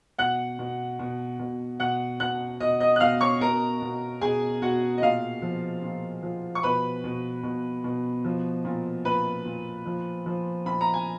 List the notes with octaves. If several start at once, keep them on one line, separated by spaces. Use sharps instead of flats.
B2 F#5 F#6
B2
B2
B2
B2 F#5 F#6
B2 F#5 F#6
B2 D#5 D#6
D#5 D#6
F#6
B2 F5 F6
C#5 C#6
B2 A#4 A#5
B2
B2 G#4 G#5
B2 F#4 F#5
D#5
A#2 F5
F3
A#2
F3
C#6
B2 B4 B5
B2
B2
B2
F3
A#2
A#2 B4 B5
A#2
F3
F3
A#2 B5
A#5
G#5